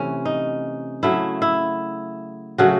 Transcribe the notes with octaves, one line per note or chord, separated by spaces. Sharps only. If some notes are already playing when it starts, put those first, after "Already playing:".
Already playing: C3 E3 A3 C#4
D#4
C#3 F#3 A3 E4
E4
C#3 F#3 A3 F#4